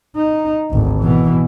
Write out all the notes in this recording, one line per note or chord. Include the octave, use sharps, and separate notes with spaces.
D#4
G#1 D2
B2 E3